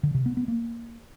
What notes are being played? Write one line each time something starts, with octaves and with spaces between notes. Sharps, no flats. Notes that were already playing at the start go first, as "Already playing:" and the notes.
D3
C3
B3
B3
A#3